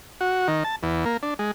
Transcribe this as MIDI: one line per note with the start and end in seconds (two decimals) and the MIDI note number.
0.21 0.48 66
0.48 0.64 51
0.64 0.76 81
0.83 1.05 40
1.05 1.17 58
1.23 1.34 62
1.39 1.51 56